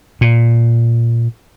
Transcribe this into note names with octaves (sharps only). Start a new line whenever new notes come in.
A#2